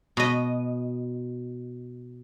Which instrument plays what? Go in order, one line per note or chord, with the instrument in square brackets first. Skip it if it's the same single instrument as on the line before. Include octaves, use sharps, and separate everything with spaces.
[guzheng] B2 D#5